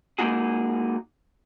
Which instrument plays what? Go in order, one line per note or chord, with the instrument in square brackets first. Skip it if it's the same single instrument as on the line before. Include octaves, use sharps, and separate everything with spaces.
[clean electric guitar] G#3 A#3 B3 D#4 F#4 G#4